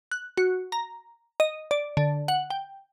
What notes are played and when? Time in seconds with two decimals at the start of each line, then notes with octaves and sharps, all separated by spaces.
0.11 F#6
0.37 F#4
0.72 A#5
1.40 D#5
1.71 D5
1.97 D3
2.28 F#5
2.50 G5